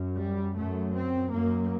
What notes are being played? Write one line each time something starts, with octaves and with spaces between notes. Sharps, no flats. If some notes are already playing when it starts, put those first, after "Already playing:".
Already playing: F#2
G3
F#2 A3
C4
F#2 A#3